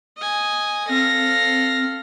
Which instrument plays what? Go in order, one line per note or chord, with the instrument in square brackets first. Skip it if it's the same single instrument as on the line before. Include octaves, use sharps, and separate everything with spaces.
[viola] D#5 G#5
[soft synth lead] C4 [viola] A4 F5 [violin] A#6